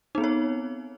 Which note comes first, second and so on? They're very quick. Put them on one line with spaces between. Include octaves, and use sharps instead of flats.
D#4 B3 C4 C#5